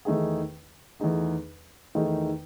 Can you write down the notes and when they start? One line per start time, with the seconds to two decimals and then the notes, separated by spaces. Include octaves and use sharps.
0.05 E2 D#3 A3 D#4 G#4
1.00 E2 D#3 A3 D#4 G#4
1.95 E2 D#3 A3 D#4 G#4